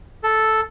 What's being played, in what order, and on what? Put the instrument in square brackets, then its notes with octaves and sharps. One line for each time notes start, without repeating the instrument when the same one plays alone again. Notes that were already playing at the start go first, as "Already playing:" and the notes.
[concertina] A4